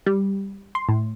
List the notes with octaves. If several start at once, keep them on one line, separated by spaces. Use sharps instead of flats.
G3
C6
A2